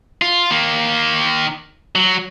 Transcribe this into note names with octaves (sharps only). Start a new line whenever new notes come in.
F4
D#3 A#3
F#3